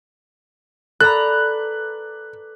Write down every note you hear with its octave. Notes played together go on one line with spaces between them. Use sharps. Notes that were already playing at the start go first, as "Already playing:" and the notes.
A4 B4 D5 A#5 F#6